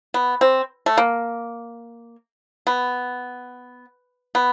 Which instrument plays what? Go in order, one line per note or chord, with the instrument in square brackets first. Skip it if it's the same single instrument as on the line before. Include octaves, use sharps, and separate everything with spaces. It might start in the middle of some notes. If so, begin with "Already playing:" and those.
[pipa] B3
C4
A3
A#3
B3
B3